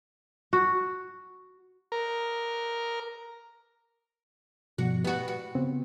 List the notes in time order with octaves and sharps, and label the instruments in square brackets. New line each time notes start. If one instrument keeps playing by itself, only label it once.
[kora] F#4
[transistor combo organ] A#4
[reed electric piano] G2 B2 F3 [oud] F#4
[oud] B3 F#4 [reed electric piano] G4
[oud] F#4
[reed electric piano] C#3 B3 C4